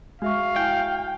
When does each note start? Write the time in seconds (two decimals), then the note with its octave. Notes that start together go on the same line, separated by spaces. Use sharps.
0.22 G#3 F#4 E5 F5 C#6
0.56 E4 G5 G#5